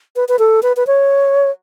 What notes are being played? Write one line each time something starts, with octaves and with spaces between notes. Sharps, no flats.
B4
B4
A4
B4
B4
C#5